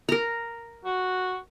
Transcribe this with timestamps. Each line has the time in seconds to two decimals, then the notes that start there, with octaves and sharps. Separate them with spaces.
0.09 A#4 A#5
0.85 F#4